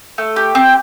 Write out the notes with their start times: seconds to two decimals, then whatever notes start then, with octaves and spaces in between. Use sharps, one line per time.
0.18 A3
0.36 G4
0.55 C4